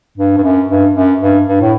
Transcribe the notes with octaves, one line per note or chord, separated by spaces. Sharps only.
G2
G2
F#2
G2
F#2
G2
G2
A2